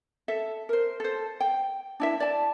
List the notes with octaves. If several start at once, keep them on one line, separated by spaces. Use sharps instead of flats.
A4 E5
A#4 C5
A4 C5
G5
D4 E4 E5
D5 A5